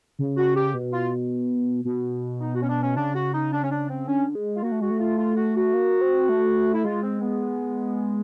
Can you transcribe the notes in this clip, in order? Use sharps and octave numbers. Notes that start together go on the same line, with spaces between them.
C#3
F#4
G4
B2
F4
B2
D#4
F#4
C#4
D4
C#4
C#3 D4
F#4
D#4
D4
C#4
D4
C4
D3 C#4
G#3
F4
A#3 F#4
A3
G#3 F#4
A3
F4
F4
F#4
F#4
A#3
C4
A3
E4
G#3 F4
C4
B3